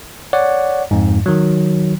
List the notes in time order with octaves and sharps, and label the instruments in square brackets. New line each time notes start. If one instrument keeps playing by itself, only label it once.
[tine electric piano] C#5 D5 F#5
F2 G#2
D#3 F#3